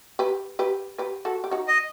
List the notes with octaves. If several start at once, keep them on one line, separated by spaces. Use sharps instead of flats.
G4 B4
G4 B4
G4 B4
F#4 A4
G4
D#4 F#4
D#5